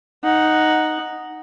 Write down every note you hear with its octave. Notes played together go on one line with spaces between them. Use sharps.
D#4 F#5